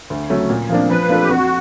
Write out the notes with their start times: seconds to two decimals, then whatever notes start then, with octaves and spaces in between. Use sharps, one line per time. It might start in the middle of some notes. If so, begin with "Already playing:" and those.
0.10 D2
0.30 C#3 F#3 A3 C#4
0.50 A#2
0.69 F3 A#3 D4
0.89 F3 B4
1.09 A#3 D4 F4 A4
1.22 G4
1.29 F2 F#4